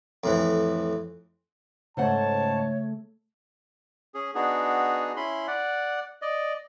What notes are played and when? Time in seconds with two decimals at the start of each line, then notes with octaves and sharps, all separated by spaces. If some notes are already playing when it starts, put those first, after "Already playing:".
0.24 F2 A2 E3
1.97 G#2 C#3 A3 C5 C#5 F#5 A5
4.14 C#4 G#4
4.35 B3 D4 D#4 F#4 G#4
5.17 C#4 E4 B5 C6
5.47 D5 F#5
6.22 D5 D#5